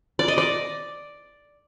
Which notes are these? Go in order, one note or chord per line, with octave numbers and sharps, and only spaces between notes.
D5
D#5
D5